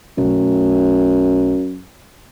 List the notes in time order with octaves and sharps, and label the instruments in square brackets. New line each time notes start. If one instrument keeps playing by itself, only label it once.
[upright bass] B1 A3 [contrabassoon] F#2